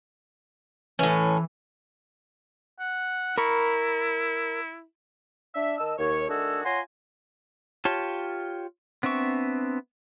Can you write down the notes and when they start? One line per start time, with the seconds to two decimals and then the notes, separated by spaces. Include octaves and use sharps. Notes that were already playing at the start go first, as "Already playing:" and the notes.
0.99 A2 E3 C#4
2.80 F#5
3.38 E4 A#4 B5 C#6
5.54 D4 E5
5.78 D#3 D#5 A5 E6
5.98 D#2 C#5
6.29 D#3 A3 D4 F#4 G#4 E6
6.64 F4 C#5 F#5 G#5 A#5 C6
7.85 F4 G4 C#5 A5
9.03 B3 C4 D4 E5 C#6